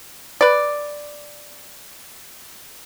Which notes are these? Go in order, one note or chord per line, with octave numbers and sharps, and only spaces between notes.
B4 D5